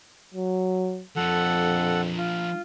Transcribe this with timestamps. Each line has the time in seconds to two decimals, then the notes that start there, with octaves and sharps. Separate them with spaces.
0.34 F#3
1.16 F2 F3 D4 A4 F#5
2.18 F4